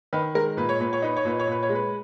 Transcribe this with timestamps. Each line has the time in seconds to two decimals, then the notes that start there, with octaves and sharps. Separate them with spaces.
0.13 D#3 B4
0.35 G#3 A#4
0.57 A#2 B4
0.69 C#5
0.80 A#2 B4
0.93 C#5
1.02 D#4 B4
1.16 C#5
1.25 A#2 B4
1.39 C#5
1.47 A#2 B4
1.63 C#5
1.69 G#3
1.75 B4